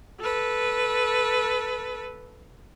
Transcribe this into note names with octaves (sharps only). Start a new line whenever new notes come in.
A4 B4